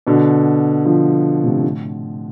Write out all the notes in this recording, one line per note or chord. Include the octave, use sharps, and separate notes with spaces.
B2 D3
D3 F3
A2 C3
A2